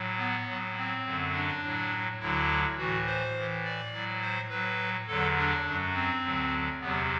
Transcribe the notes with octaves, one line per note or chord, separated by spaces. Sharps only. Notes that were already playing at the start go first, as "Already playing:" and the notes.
Already playing: A2 F#3
B3
A2 F#3
C4
F#2 D3 F#3
D4
A2 F#3
D2 D3 F#3 E4
A2 E3 F#4
C5
A2 E3
D5
A2 F#3
C5
A2 F#3 B4
E2 D3 F#3 A4
D4
F#2 F#3
C4
D2 D3 F#3
E2 C3 F#3 B3